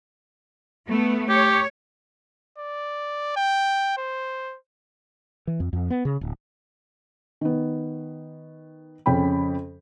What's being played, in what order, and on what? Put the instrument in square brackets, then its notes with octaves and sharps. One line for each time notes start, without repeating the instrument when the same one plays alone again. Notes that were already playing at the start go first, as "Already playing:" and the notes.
[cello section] A3 B3
[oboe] G4 [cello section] C#5
[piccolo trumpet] D5
G5
C5
[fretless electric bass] E3
F2
F2
B3
C#3
D1
[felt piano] D#3 B3
F2 C#3 C#4 G5 B5